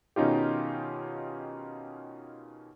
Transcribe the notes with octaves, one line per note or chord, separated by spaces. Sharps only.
B2 D#3 C#4 D#4 F4 G4